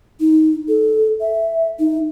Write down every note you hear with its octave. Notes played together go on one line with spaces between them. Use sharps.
D#4
A4
E5
D#4